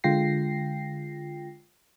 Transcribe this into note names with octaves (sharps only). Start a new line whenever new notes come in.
D3 G#3 F4 G5 A#6 C7